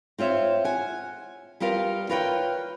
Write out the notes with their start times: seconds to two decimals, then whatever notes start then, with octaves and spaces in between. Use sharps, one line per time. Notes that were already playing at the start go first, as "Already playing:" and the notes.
0.18 C4 F4 C#5 E5
0.65 F#5 G#5
1.60 G3 B3 F4 A#4 F5
2.09 F4 A#4 B4 C#5 E5 G5